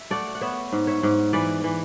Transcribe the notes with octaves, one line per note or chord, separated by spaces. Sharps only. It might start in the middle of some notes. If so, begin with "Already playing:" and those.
Already playing: E5
A3 D5 F#5
F#5
B3 C#5 E5
G#2
C#5 E5
G#2
E3 B4 D5
E3